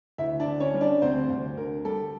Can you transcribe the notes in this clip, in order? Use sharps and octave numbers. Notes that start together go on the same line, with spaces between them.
D2 E4 E5
D4 D5
D3
C#4 C#5
G3
D4 D5
D2 C4 C5
D2
D3 A#4
G3 A4